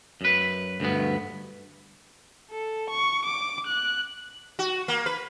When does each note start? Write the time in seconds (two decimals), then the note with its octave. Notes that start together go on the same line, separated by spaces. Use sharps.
0.21 F#2 B4
0.80 D2 G2 B3
2.51 A4
2.90 C#6
3.25 D6
3.66 F#6
4.59 F#4
4.88 A#3
5.06 B4